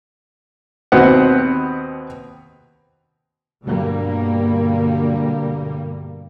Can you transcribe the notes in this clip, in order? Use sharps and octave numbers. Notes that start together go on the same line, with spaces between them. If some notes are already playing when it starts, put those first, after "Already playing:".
D#2 B2 B3 C4 F#5
G2 B2 D3 G3 A#3